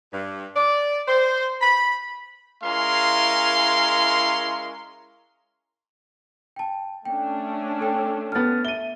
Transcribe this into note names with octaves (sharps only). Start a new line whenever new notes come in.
G2
D5
C5
B5
G#3 C#4 E4 A#4 F5 C6
G5 A5
A3 C#4 D4 G5
A4 G5
B3 A4 F6 A6
E5 D#7 G7